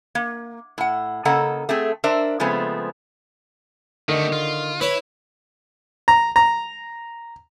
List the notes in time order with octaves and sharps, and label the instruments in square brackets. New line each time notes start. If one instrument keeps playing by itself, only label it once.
[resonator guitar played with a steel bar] A#3
A2 F#5
C#3 A#3 A4 D#5 F#5 A#5
A3 C4 G#4
D4 A#4 C5 D5 E5
C#3 F3 G#3 A3 B3 C4
[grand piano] D3 D#4 [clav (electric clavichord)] D#3 [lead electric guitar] A3 G4
[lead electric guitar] F4
[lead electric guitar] E4 [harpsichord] B4 C#5
[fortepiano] A#5
A#5